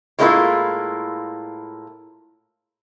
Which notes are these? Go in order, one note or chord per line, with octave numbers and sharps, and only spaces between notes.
A2 G#3 A#3 C4 E4 F4